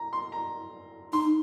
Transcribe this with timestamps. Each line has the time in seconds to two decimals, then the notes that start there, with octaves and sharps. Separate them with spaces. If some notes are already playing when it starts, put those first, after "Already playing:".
Already playing: A#5
0.13 C6
0.32 A#5
1.13 D#4 C6